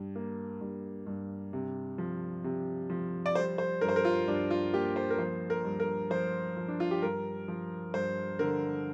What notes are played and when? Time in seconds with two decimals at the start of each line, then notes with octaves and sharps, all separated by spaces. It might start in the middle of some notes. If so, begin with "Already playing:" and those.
Already playing: G2
0.16 A#3
0.61 G2
1.07 G2
1.53 C3
1.98 F3
2.44 C3
2.90 F3
3.26 D5
3.35 G3 C5
3.58 C5
3.81 G2 A#4
3.89 C5
3.96 A#4
4.05 F4
4.28 G2 D4
4.50 F4
4.73 A#3 G4
4.96 C5
5.10 A#4
5.19 F3 C5
5.50 A#4
5.65 G2
5.80 A#4
6.10 F3 C5
6.56 F3
6.68 D4
6.80 F4
6.91 G4
7.02 G2 A#4
7.48 F3
7.94 G2 C5
8.39 D3 A#4